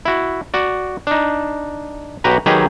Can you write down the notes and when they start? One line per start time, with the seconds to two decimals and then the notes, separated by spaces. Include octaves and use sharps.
0.05 E4 F#4
0.54 F#4 D5
1.07 D4 D#4
2.24 B1 F#4 G4 B4 A#5
2.46 D#3 F#3 D#4 G4 G#4 B4